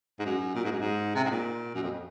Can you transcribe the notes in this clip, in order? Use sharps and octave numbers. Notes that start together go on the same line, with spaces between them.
G#2
F#2
A#2
G#2
F#2
G#2
C3
G#2
A#2
F#2
F2